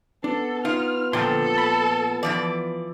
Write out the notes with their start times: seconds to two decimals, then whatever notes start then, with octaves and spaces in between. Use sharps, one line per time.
0.24 B3 D4 A4
0.65 D#4 F4 F6
1.13 A#2 D3 F3 A4 G5 C6
1.58 B5
2.23 E3 F3 D5